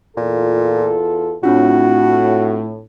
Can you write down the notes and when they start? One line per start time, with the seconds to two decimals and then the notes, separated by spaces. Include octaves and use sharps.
0.17 E2 A#2 F4 A4
1.44 A2 C4 D4 F4 F#4